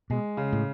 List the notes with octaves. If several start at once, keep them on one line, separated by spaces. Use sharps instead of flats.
B2 G#3
C#3
A2